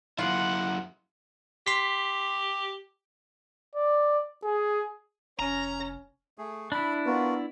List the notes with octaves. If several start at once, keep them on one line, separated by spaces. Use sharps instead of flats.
F#2 E4 F4 F#5
G4 C6 B6
D5
G#4
F1 C#4 A#5
A3 G#4
D4 E4 B5
B3 F4 F#4 A#4